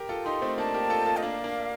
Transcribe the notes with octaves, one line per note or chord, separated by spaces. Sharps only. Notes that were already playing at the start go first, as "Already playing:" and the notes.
Already playing: G4 A#4
F4 A4
D#4 G4 C6
A3 C4
A#3 D4 A5
G4 A#4
F4 A4
F4 A4
D#5
A#3 D4 F5
A#3 D4